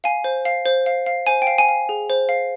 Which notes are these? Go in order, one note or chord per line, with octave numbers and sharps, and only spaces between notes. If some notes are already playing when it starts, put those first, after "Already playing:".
F5 G#5
C5
F5
C5
F5
F5
C5 G#5
G5
F5
G#5
F5
G#4
C5
F5